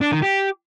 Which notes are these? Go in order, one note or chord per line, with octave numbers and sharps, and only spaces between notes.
D4
D#3
G4